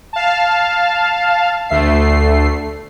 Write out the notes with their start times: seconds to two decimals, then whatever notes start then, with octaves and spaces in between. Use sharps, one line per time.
0.13 F5 A5
1.69 D2 A3 C7